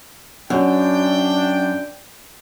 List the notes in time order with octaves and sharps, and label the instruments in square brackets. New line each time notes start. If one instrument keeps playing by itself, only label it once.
[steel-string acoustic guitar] F#2 [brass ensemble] D4 G5